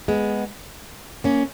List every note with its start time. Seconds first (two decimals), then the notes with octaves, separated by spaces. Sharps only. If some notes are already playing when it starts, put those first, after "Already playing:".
0.08 G#3 B3
1.24 A#3 C#4